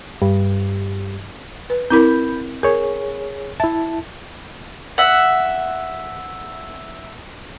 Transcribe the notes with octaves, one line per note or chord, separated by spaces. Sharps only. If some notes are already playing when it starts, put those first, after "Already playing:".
G2
B4
C4 E4 A#4 B5 G6
G#4 A#4 C#5
E4 E5 A5
E5 F#5